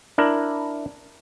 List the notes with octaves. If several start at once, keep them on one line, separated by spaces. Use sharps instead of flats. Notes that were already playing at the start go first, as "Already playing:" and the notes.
D4 E4 A#4